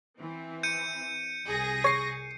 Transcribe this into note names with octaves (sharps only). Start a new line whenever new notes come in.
E3 C4
G6 C#7 D#7
C2 G#4 A#6
C#5 C#6 C7